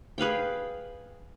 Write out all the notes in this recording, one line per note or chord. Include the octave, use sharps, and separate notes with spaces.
G#4 B4 F5 G5